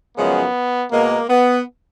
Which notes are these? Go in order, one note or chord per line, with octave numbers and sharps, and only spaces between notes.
F#2 C#3 F3 G#3 B3
B2 G#3 A#3
B3